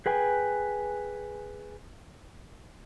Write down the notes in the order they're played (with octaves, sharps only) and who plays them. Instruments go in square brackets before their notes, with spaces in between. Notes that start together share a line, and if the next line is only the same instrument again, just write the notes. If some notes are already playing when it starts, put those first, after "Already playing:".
[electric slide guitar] G#4 B4 G5 G#5